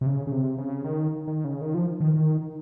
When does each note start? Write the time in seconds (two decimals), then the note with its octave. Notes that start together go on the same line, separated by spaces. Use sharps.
0.01 C3
0.06 C#3
0.27 C#3
0.32 C3
0.58 C#3
0.84 D#3
1.27 D#3
1.44 C#3
1.61 D#3
1.74 F3
2.00 D#3
2.14 D#3